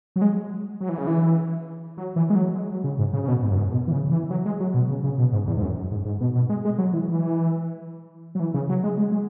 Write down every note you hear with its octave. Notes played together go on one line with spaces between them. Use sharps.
F#3
G#3
F#3
E3
C#3
E3
F#3
E3
G#3
F#3
G#3
F#3
C#3
G#2
C#3
C#3
B2
G#2
F#2
G#2
B2
E3
C#3
E3
F#3
G#3
F#3
B2
C#3
C#3
B2
G#2
E2
G#2
F#2
F#2
G#2
G#2
B2
B2
G#3
G#3
F#3
E3
E3
F#3
E3
C#3
F#3
G#3
G#3
G#3